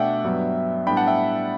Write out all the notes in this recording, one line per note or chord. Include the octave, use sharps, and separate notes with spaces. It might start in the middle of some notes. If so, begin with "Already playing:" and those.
Already playing: B2 A3 D4 D5 E5 F#5 G5
G2 F#3 B3
A2 G3 B3 D4 G5 B5
F#5 A5
E5 G5